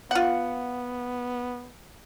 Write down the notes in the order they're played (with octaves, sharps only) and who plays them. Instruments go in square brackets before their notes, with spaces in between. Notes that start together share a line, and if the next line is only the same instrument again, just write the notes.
[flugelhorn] B3 [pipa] F4 F#5